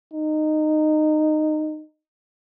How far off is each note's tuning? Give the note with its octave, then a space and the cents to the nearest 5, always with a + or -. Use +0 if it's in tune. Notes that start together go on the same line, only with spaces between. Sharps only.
D#4 -15